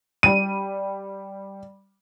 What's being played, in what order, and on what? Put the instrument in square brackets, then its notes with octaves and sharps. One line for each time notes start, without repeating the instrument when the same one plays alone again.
[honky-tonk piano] G3 D#7